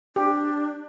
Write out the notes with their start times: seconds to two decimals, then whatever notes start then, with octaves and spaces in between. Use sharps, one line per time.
0.16 D4 G4